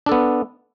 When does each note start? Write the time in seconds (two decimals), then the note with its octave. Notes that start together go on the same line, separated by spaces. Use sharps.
0.06 D4
0.09 A4
0.12 B3